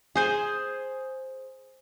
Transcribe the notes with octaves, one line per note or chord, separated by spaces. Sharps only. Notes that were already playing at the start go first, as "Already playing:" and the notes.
G#4 C5 G#5